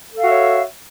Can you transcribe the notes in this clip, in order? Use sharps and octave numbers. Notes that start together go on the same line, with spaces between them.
F#4 A4 C#5 E5 F5